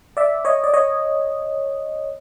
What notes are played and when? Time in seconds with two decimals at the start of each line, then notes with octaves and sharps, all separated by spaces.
0.17 D5 E5
0.45 C#5 D#5
0.64 D5
0.74 C#5 D#5